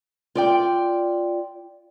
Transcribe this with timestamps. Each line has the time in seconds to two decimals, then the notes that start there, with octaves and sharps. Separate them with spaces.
0.35 F4 D5 G5